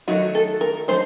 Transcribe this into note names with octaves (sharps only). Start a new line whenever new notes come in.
D#3 F#3 A3 D#4 F#4
A4
A#4
F#3 A3 D#4 C5